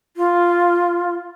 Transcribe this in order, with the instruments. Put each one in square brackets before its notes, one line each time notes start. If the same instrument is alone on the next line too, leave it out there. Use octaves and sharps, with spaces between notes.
[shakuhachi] F4